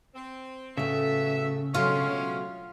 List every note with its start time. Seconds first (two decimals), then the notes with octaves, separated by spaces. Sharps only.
0.15 C4
0.77 A2 C#3 F#3 A3 B3 E5
1.74 B2 F3 F#3 G#3 A3 C#4 F4